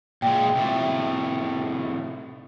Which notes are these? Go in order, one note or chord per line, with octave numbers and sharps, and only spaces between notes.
A#2 G#3 G5
A2 C3